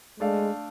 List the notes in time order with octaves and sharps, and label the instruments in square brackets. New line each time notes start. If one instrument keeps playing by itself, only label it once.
[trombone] G#3 [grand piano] A3 D4 A4 D5 F5